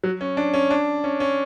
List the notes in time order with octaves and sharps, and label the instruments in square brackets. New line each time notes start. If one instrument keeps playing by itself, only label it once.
[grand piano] F#3
C#4
D4
C#4
D4
C#4
C#4